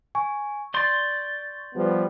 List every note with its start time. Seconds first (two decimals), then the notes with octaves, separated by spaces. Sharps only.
0.15 G#5 C#6
0.74 D5 C6 G6 A6
1.75 F3 G3 B3